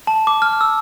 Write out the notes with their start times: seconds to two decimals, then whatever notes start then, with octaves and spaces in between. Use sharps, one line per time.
0.07 A5
0.27 D6
0.42 F6
0.61 E6